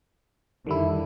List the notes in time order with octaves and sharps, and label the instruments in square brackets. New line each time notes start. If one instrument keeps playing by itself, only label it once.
[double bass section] F2 D3 [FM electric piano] D#3 G3 E4